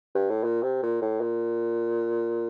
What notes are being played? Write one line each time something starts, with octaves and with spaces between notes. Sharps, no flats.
G2
A2
A#2
C3
A#2
A2
A#2